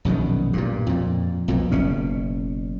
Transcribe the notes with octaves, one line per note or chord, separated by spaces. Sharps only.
A#1 F#2 B2 D#3
G2 A#2
F2 A#2
B1 F2 A#2
F#1 B2 C#4